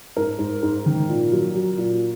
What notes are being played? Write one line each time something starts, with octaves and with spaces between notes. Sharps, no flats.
G#2 A#4
G#2
G#2
D#3
A#2
F#3
F#3
A#2